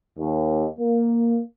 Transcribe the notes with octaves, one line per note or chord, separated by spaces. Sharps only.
D#2
A#3